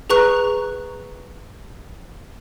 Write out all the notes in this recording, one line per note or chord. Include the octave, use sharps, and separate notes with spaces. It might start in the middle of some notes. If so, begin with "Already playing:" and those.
G#4 B4 A#5 C#6 F#6